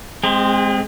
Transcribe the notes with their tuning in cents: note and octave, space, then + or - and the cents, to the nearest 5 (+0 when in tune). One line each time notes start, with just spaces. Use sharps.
G#3 +0 C4 +0 G#4 -45